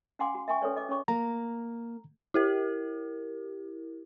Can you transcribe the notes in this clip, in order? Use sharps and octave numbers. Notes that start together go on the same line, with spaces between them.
C#4 F5 F#5 G#5 C6 D6
F#4
E5 G5 G#5 C#6
C#4 A4 B4 C#5 D5
D#5 D6
C#4 C#5 C#6 D6
A#3 A#5
E4 G4 A#4